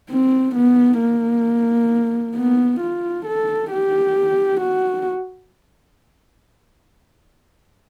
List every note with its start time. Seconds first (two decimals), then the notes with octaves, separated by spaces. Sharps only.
0.10 C4
0.55 B3
1.00 A#3
2.36 B3
2.80 F4
3.26 A4
3.71 G4
4.61 F#4